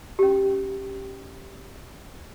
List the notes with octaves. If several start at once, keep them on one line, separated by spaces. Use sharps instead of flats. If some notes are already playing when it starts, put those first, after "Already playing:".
C#4 G4